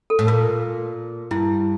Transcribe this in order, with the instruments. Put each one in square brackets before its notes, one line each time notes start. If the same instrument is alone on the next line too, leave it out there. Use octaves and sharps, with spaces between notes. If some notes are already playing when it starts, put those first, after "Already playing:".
[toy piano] A4
[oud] A2
[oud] A#2 [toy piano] A#4
[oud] G2 [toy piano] E4